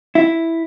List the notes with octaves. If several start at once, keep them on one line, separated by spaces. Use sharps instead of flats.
E4